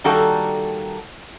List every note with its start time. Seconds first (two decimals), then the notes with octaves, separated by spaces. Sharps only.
0.04 D#3 G3 A#3 F#4 A4